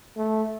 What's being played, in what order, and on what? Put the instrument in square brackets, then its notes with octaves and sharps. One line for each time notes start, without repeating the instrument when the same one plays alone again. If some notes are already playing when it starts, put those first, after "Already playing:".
[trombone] A3